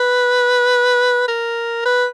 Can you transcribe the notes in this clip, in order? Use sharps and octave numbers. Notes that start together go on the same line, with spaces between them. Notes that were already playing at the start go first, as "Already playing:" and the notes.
Already playing: B4
A#4
B4